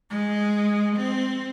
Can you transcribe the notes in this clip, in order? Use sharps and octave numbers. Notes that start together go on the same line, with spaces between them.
G#3
C4